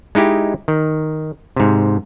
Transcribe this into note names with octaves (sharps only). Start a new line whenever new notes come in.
G#3 D#4 E4 G4
D#3
G#2 C3